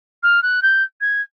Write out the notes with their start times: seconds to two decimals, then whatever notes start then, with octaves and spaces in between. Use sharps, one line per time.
0.23 F6
0.43 F#6
0.62 G6
1.01 G#6